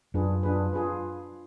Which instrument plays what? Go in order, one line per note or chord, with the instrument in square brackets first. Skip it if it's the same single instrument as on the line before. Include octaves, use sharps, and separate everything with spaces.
[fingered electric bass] F#2 [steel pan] D4 F4 G#4 B4
[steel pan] D4 F4 G#4 B4
F4 G#4 B4